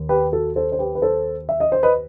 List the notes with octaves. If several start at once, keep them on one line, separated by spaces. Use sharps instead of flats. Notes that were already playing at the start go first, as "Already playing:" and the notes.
Already playing: D#2
G4 B4
F#4 A4
A4 C5
C5
G4 B4
B4
A4 C5
E5
D#5
C5
B4 D#5